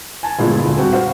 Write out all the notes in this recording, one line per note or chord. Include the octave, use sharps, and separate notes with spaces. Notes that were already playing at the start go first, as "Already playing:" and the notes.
G#5 A5
G1 A#2 G#3 E4 G#4
D2 A#2
G3 C4 F#4
C5 F5 F#5